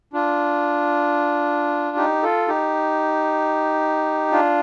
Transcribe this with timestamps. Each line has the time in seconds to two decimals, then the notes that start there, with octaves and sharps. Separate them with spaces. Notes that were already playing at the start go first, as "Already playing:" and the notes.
0.13 D4 F4
1.97 D#4 G4
2.23 F4 A4
2.48 D#4 G4
4.31 D4 F4